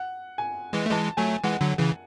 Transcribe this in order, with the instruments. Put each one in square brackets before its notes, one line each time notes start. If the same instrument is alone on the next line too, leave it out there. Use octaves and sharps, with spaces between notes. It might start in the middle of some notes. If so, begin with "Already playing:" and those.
Already playing: [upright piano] F#5
G#5
[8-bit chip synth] E3 G#3
A3
[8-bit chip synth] E3 G#3 [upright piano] A5
[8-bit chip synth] F#3 A3 [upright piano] G#5
[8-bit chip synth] E3 G#3 [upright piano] F#5
[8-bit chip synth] D3 F#3
C#3 E3